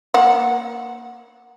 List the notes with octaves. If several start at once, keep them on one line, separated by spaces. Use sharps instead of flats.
A#3 F#5